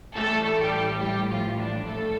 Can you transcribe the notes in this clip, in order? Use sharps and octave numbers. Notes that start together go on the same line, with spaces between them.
A1 A2 G3 A3 A4
G3 G4
G3 G4
F3 F4
D4
A1 A2 G3 A3 A4